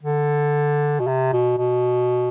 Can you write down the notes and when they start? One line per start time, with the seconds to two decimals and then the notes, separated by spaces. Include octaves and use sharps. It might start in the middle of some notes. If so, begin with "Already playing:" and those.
0.03 D3
1.00 B2
1.07 C3
1.33 B2
1.58 B2